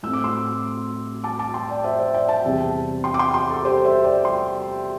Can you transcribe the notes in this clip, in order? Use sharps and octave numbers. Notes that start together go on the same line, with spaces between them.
A2 A3 C4 E6
D6
C6 E6
A5 D6
A5 D6
G5 C6
D5 G5
C5 E5
C5 E5
D5 G5
E5 A5
E2 C3 G3 C4
G5 C6
D6
G5 C6
G5 C6
A4
G4 C5
C5 E5
D5 G5
G5 C6